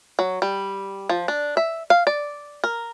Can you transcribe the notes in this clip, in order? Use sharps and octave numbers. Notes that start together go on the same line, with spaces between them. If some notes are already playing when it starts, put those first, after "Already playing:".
F#3
G3
F3
D4
E5
F5
D5
A#4